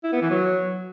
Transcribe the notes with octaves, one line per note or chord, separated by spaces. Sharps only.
E4
B3
E3
F#3